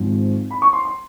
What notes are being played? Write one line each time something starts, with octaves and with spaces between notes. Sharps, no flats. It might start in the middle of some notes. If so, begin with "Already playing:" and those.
Already playing: G#1 G#2 F3
B5
C#6
C6
C6